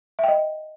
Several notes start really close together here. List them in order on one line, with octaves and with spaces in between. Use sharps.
E5 G5 D#5